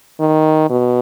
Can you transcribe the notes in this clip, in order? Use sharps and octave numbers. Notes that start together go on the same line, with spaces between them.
D#3
B2